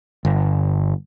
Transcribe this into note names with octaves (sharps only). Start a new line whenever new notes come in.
G1